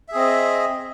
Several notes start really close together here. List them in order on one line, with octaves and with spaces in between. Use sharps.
E5 G#4 C4 D#5